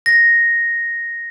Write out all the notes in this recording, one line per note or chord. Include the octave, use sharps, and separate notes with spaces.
A#6